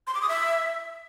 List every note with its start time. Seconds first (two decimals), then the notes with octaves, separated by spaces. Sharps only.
0.07 C6
0.14 D6
0.21 D#6
0.29 E5